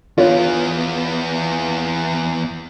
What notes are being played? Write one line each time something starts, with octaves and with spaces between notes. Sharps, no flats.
E2 B3 F4 C#5